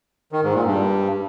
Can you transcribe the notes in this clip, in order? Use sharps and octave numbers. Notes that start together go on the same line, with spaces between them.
D#3
G#2
A#2
G2